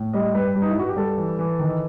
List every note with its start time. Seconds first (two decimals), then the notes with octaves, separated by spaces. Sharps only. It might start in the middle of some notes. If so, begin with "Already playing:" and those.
Already playing: A2
0.13 G3 D#5
0.34 G2 B4
0.55 G3
0.62 D#4
0.71 E4
0.76 G2 F#4
0.89 G4
0.96 G3 A4
1.18 E3
1.39 E3
1.59 D#3